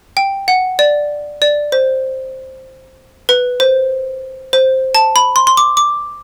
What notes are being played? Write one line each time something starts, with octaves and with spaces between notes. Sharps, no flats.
G5
F#5
D5
D5
C5
B4
C5
C5
A5
B5
C6
C6
D6
D6